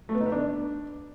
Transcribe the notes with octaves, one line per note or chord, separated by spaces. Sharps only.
A3
B3
D#4
B3
D4